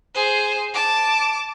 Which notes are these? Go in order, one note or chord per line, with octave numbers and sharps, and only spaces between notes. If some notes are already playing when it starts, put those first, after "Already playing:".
G#4 C5
A5 D6